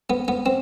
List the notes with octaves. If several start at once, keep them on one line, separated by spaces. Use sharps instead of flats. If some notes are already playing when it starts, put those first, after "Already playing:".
B3
B3
C4